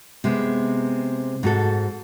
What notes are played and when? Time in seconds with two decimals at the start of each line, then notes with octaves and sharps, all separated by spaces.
0.24 C3 G#3 B3
1.43 G#2 F#4 A4